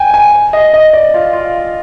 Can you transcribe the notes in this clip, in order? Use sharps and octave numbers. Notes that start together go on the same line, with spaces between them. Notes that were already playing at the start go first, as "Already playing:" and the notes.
Already playing: G5 G#5
G#5
D#5
D#5
D5
F4
F4